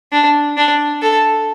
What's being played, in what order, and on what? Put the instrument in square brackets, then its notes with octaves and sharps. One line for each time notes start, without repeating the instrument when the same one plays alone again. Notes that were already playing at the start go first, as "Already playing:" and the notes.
[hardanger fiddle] D4
D4
A4